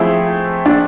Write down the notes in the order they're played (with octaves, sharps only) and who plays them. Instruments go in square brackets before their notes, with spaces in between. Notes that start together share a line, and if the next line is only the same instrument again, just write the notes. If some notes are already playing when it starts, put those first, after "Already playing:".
Already playing: [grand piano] F3 A3 C4 G#4 [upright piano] E4
[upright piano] D4